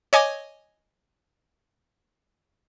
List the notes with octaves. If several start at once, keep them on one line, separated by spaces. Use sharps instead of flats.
C#5 D#5 G#5 D6 G#6